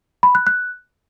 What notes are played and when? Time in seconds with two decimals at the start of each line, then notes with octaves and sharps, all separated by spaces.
0.23 B5
0.35 F#6
0.47 F#6